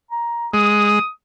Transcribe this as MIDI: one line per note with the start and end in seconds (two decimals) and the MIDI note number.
0.11 0.48 82
0.54 0.99 56
0.54 1.09 87